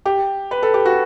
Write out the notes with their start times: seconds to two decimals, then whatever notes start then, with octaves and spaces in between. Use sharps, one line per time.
0.06 G4
0.51 B4
0.63 A4
0.74 G4
0.85 F#4